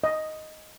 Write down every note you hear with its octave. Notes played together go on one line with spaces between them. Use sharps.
D#5